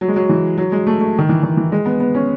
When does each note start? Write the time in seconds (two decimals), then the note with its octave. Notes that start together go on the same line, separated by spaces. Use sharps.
0.01 F#3
0.08 G#3
0.16 F#3
0.29 E3
0.58 F#3
0.72 G#3
0.87 A3
1.01 A3
1.19 D#3
1.29 E3
1.43 D#3
1.57 E3
1.72 G#3
1.86 B3
2.00 B3
2.15 C#4